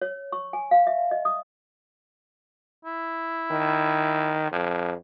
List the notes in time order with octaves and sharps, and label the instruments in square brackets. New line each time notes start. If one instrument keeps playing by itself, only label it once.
[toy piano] C#5
C#6
G#5
F5
E5
D#5
D#6
[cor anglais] E4
[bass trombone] D#3
F2